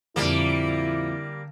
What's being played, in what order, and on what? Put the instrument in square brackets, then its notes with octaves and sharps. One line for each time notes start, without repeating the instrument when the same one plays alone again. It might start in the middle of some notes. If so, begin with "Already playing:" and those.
[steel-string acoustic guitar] F2 A#2 [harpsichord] D3 [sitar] G3 A#3 [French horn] E4